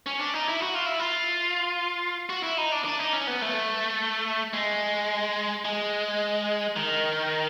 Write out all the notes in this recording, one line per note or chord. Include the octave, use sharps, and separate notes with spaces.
C#4
D4
D#4
E4
F#4
F4
E4
F4
F#4
E4
D#4
D4
D4
D#4
C#4
B3
A3
G#3
G#3
D#3